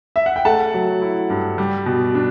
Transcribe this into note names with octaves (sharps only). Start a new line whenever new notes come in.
E5
F#5
G5
A3 F#5 A5
F#3
E4
G2
G3
B2
D4